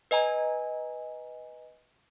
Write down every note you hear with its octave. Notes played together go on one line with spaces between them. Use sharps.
B4 D#5 G#5 A#5